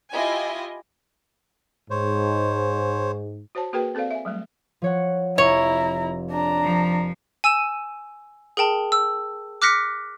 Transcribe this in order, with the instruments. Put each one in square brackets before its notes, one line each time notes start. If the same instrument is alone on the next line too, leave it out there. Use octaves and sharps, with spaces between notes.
[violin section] E4 F4 G4 D#5 G#5
[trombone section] G#2 [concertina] C5 C#5
[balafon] F#4 C5 C#5 A5
A#3 F#4 G#4 A#4 B4 G5
C4 A4 C5 D5 F5
E5 G#5
F#3 G3 A3
[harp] F3 C#5 F#5
[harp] F1 [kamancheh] E4 A#5 [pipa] C#5
[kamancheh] D4 A#5
[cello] F3
[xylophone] G#5 E6 D#7 E7
G#4 A#4 G5 A5
E6
D6 F6 F#6 A#6 B6 C#7